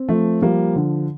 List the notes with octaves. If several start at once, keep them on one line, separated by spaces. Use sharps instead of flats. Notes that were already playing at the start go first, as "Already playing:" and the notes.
Already playing: C4
F3 A3
F3 G3 A#3
D3